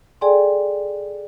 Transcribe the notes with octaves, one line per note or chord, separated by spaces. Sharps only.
G#4 A4 D5 G5 G#5 C6